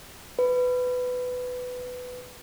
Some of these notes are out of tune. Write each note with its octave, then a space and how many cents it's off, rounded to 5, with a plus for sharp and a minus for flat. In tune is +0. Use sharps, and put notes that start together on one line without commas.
B4 +15